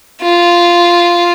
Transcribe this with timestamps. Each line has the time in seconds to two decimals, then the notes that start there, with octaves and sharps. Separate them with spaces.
0.22 F4